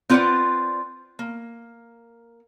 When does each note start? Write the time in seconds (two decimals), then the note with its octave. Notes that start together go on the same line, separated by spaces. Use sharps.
0.10 C4 F4 B4 C#5 D5 F#5
1.19 A#3